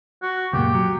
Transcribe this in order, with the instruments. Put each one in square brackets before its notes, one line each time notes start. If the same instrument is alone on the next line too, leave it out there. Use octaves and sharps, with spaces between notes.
[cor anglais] F#4
[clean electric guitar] C#2 F#2 A#2 [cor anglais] G4
[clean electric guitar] F#3